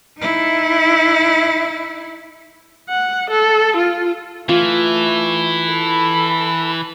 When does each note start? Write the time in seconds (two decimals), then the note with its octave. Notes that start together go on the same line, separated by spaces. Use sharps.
0.19 D#4 E4
2.89 F#5
3.30 A4
3.76 F4
4.49 E3 A3 F4
5.67 A4 B5